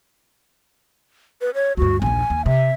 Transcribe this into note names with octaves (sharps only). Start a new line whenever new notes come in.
B4
C#5
D2 G2 F#4
A#1 D#2 G#5
D#2
C3 E5